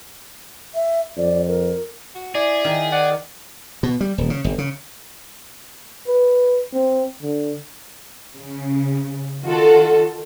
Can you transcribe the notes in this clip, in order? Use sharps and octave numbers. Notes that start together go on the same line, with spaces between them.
E5
F2 D5
A#4
F#4
E4 G#4 D5
D#3
D5 F#5
B2
G3
D#1
C#3
G1
C#3
B4
C4
D3
C#3
D#3 F4 F#4 A4